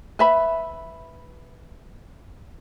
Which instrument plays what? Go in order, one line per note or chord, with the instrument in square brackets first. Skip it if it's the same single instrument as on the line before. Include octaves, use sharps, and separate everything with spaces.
[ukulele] B4 E5 B5